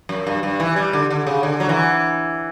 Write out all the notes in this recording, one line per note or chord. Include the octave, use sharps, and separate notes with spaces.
F#2
G2
G2
E3
G3
D3
D3
C#3
D3
F#3
E3